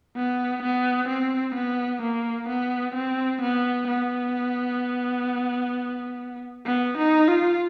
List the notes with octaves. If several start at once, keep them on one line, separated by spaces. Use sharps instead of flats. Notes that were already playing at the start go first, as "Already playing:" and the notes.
B3
B3
C4
B3
A#3
B3
C4
B3
B3
B3
D#4
F4